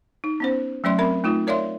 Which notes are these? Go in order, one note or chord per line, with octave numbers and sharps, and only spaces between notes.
D#4
B3 C#4 C5
F#3 A3 C#4 D5 E5 C6
C4 A#4 E5 B5
A3 D#4 F4
A#4 C#5 D5 E5 F5 C6